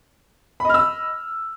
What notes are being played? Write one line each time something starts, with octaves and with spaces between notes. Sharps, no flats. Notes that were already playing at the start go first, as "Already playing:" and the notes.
D#5 B5 E6 F6